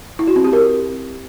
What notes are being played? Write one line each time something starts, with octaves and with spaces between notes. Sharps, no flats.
E4
F#4
C4
G4
A#4